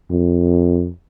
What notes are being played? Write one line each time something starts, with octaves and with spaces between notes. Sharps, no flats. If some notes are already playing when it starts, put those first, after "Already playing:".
F2